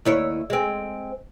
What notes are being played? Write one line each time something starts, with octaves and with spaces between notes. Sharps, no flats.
D#2 E4 C#5
G#3 C4